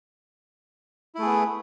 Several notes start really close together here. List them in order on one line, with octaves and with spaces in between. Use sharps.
E4 A3 G#4 B3